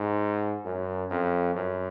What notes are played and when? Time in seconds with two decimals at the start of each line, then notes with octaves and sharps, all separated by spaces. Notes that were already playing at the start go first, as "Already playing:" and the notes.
Already playing: G#2
0.65 F#2
1.11 F2
1.55 F#2